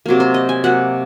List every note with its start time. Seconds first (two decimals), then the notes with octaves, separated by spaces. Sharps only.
0.06 C3 F#3 A#3
0.20 C5
0.34 D#5
0.49 G#5
0.64 C3 F#3 A#3 F#5